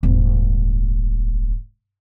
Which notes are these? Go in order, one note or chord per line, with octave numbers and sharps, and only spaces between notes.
D#1 G#1